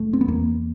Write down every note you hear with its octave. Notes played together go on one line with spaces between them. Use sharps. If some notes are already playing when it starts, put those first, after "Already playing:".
Already playing: F1 A3
C4
B3
E2 A#3